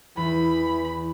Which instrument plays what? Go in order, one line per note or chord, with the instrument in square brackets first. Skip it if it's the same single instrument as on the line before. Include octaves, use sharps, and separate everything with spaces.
[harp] E2 [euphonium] E3 [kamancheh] B5